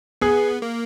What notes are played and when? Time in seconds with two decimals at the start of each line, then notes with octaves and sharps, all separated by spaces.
0.21 B3 G#4
0.62 A#3